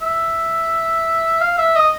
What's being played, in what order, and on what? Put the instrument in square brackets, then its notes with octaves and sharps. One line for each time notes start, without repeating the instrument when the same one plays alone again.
[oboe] E5
F5
E5
D#5